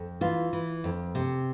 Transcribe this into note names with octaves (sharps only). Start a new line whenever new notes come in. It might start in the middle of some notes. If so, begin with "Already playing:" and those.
Already playing: F2
E3 F4
E3
F2
C3